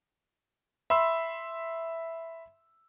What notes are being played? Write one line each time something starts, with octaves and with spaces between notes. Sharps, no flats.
E5 B5 C6 E6